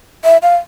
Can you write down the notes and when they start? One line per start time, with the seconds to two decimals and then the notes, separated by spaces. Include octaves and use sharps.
0.24 E5
0.43 F5